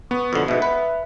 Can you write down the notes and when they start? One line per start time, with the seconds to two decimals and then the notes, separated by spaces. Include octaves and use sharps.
0.11 B3 C#6 D#6
0.33 F2 G#2 B2 D3
0.48 G#2 B2 E5
0.62 B4